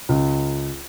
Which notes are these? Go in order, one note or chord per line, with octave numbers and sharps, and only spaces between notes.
C#2